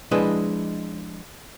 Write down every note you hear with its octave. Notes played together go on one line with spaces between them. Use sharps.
F3 G#3 D4 E4 B4 D#5